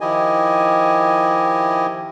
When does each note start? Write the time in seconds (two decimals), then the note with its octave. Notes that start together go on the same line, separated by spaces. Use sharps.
0.01 D#3 F3 E4 G4 D#5 G#5